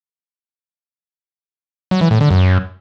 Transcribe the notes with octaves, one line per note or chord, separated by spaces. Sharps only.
F#3
E3
A2
D3
F#2